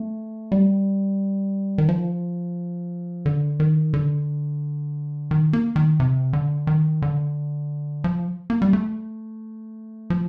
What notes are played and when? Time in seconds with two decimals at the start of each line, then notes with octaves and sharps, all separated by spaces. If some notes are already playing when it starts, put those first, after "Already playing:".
Already playing: A3
0.52 G3
1.78 D#3
1.89 F3
3.26 D3
3.60 D#3
3.94 D3
5.31 D#3
5.53 A#3
5.76 D#3
6.00 C3
6.33 D3
6.67 D#3
7.02 D3
8.04 F3
8.50 A#3
8.62 G3
8.73 A3
10.10 F3